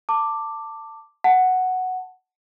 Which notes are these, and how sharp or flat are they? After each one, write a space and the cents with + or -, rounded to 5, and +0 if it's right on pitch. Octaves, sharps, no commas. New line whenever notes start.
A5 +25 D6 +0
F#5 +0 A5 +0